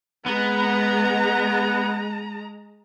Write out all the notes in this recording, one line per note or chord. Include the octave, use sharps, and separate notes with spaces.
G#3 B3 F#5 A#5